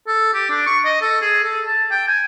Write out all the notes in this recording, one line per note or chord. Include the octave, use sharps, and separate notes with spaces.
A4
G4
D4
C#6
D#5
A4
G#4
A4
A5
G5
G#5